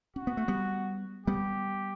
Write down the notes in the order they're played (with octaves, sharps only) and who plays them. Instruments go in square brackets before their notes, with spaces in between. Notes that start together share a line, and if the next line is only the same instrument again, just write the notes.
[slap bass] C#4 [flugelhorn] F#4
[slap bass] B3
A3
G3 B3
[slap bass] G3 B3 [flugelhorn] G4